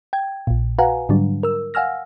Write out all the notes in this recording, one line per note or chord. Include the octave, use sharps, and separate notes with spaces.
G5 G#6
A#1 A#2
F#4 B4 F5 F#5 G#5 A#5
G#2 D3 F#3 G3 D4
A#4 E6
F5 F#5 G#5 E6 F6 A#6